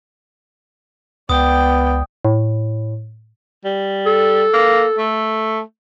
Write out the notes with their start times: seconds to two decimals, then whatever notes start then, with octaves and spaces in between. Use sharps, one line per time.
1.29 C#2 B3 D5 G5 D#6
2.25 A2
3.65 G3
4.06 A4
4.53 A#3
4.98 A3